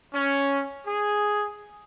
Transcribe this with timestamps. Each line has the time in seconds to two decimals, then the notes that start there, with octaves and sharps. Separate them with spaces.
0.13 C#4
0.87 G#4